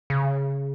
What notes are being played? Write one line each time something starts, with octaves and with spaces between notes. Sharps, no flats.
C#3